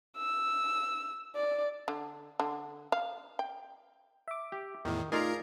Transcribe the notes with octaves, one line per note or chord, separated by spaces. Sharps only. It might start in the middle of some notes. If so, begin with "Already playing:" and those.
E6
D5
D3
D3
F5
G5
E5 D6
G4
E2 A2 D#3
A3 D#4 F4 G#4 A#4 D5 F5 A#5